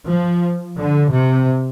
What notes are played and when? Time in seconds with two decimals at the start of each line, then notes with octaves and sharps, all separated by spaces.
0.08 F3
0.78 D3
1.12 C3